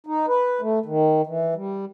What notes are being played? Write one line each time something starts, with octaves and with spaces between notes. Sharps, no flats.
D#4
B4
A3
D#3
E3
G3